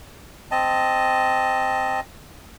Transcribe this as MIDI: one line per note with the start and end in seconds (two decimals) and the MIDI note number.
0.51 2.00 60
0.51 2.00 75
0.51 2.00 81